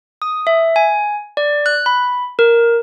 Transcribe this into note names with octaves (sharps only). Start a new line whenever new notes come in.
D#6
E5
G#5
D5
F#6
B5
A#4